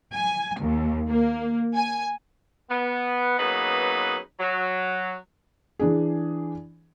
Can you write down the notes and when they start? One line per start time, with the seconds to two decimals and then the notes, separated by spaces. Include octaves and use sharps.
0.14 G#5
0.61 D#2
1.09 A#3
1.76 G#5
2.70 B3
3.39 C#3 F#3 A#3 B3 D#4 B4
4.40 F#3
5.79 E3 D4 G#4